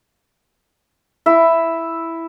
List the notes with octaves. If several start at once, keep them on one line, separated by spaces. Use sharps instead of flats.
E4 E5